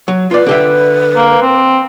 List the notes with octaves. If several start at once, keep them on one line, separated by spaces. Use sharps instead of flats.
F#3
F4 B4 D5
D3 G4 E5
A#3
C4